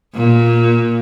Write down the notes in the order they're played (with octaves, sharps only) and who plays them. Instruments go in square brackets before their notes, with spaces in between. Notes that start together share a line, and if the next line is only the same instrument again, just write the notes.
[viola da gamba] A#2